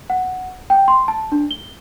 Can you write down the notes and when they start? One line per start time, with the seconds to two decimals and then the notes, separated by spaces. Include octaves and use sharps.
0.10 F#5
0.70 G5
0.88 C6
1.08 A5
1.32 D4
1.51 G7